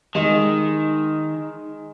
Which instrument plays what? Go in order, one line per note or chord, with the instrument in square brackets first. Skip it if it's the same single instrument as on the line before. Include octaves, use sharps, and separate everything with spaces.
[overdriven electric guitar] D#3 [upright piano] G#3